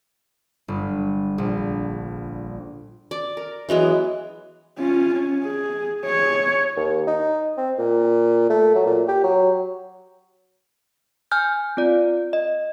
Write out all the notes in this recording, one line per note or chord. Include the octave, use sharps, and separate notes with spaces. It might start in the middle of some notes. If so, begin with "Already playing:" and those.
G1
A#1
D5
A#4
E3 F#3 G#3 B3
C#4 F4
C#4
G#4
G#4 C#5
D#2
D#4
C4
A#2
A3
F#3
A#2
G4
F#3
G#5 F6 G6
C4 F4 D5
D#5